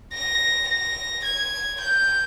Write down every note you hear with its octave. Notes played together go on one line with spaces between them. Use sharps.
A#6
A#6
G#6
G6